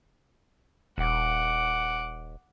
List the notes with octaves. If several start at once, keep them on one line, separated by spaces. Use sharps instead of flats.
D#1 F#5 D6